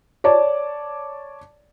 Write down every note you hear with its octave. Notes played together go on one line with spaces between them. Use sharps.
C#5 D5 A5